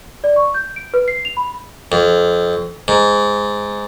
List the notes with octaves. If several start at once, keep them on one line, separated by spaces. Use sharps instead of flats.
D5
C#6
G6
D7
B4
C7
F7
B5
F2
G#2